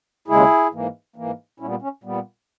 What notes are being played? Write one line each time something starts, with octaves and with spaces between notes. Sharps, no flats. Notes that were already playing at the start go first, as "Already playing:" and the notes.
D#2 C#3 G#3 E4 G#4
G#2 E3 A#3
G#2 E3 A#3
A#2 G3 B3 C#4 E4
C#4
A#2 G3 B3